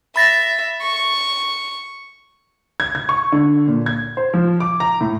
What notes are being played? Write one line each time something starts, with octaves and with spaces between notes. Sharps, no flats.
E5 B5 A6 A#6
C#6
G#6
G#6
C#6
D3
A#2
G#6
C5
F3
D6
A#5
A2